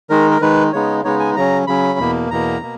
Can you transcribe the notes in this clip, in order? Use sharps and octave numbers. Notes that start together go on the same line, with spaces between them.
D#3 G#3 D#4 A#4
A#4
D#3 G#3 D#4 B4
C#3 G#3 B3 D#4 C#5
C#3 G#3 B3 D#4 C#5
G#5
C#3 F#3 C#4 A#5
C#3 F#3 C#4 B5
E2 B2 A#3
E2 B2 A#3 A#5
B2 A#3